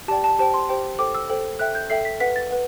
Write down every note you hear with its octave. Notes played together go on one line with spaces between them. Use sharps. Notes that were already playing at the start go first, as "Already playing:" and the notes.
G4 D5 G5 A5
A5
G4 C5 G5 A5
C6
G4 C5 G5
A4 C5 G5 D6
E6
A4 C5 G5
A4 E5 G5 F#6
G6
A4 E5 G5 C7
B6
B4 F#5 B6
A6
B4 F#5